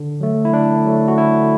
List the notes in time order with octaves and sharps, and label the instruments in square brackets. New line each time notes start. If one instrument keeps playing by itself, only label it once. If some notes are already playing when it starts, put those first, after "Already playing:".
Already playing: [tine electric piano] D3
F#3 A3
E4
D3 D4
F#3 A3
F#4
D3 E4